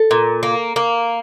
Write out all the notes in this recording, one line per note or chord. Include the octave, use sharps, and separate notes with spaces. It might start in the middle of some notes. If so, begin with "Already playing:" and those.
Already playing: A4
A#2
A#3
A#3